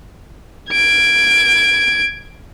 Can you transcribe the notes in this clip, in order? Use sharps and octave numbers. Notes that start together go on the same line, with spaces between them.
G#6 D7